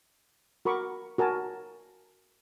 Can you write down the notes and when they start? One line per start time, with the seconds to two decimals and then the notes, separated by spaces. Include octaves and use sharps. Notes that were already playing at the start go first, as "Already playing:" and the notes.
0.65 F#4 A#4 B5 C#6 D6
1.18 F#4 A#4 G#5 A5